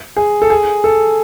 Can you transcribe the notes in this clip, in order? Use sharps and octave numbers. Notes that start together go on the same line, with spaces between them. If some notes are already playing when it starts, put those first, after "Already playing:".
G#4
A4
G#4
A4